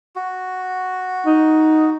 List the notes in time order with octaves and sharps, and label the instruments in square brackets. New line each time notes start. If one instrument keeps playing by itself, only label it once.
[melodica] F#4
[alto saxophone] D#4